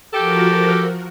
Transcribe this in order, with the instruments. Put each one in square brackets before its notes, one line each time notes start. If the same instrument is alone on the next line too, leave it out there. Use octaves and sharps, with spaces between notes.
[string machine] F3 F#4 A#4 [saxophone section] G4 A4